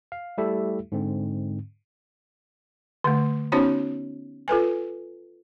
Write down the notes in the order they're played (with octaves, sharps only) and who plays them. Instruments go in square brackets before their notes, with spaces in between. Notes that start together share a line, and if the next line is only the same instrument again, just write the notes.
[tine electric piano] F5
G3 A3 E4 G4 A4 E5
G#2 D3 C4
[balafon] D3 A3
B3 C#4 D#4 F#4 C5 C#5
F4 A4 B4 G#5